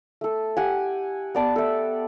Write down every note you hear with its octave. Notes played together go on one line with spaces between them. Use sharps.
A3 A4
G4 F#5 G#5
B3 D5 A5
A4 E5